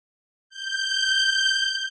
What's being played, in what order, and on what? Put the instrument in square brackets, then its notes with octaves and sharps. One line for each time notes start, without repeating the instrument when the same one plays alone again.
[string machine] G6